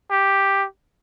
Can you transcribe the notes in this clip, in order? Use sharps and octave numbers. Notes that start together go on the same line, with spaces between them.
G4